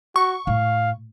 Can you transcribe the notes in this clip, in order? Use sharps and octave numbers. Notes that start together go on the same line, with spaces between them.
F#4 C#6
A2 F5